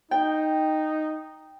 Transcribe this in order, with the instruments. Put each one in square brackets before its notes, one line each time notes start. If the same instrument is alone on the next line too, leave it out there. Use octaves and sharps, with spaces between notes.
[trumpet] D#4 [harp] G5